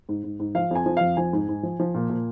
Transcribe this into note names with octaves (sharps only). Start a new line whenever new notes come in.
G#2
G#2
G#2
F3 F5
F2 G#5
F3
F2 F5
F3 G#5
G#2
G#2
F3
F3
A#2
A#2